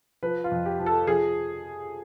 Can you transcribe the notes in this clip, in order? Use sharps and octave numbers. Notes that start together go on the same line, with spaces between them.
F3 B4
F4
F2
G4
F3
A4
F3 G#4